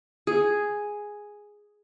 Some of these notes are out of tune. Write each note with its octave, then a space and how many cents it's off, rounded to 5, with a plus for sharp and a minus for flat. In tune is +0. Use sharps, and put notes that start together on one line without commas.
G#4 +0